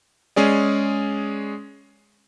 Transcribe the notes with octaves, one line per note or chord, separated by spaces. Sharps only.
G#3 C#4 G#4 D5